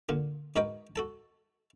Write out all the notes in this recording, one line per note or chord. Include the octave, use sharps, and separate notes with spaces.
A#2 D3 F4
G#2 F#4 A#4 B4 D#5 G5
F#4 A4 A5